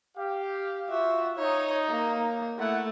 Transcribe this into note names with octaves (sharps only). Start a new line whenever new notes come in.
G4 F5
F4 F#4 E5
D#4 C#5
A#3
A3 E4 E5 F#5